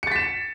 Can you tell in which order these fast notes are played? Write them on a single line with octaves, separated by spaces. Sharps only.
C#7 A6 B6 E7